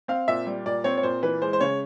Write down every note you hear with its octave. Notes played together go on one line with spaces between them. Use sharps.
C4 F5
A#2 E5
G3
A#2 D5
C4 C#5
C#5
A#2 C5
E3 B4
G#3 C5
C5
C#3 C#5